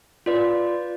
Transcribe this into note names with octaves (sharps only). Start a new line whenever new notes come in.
F4 B4 D5